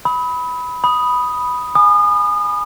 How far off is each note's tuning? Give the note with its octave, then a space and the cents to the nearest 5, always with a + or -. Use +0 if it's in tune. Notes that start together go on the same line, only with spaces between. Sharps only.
B5 +0 D#6 +40
B5 -5 D#6 +0
G#5 +0 D#6 -35